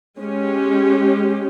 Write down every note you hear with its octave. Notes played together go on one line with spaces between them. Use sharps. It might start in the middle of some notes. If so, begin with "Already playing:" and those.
G#3 C#4 G4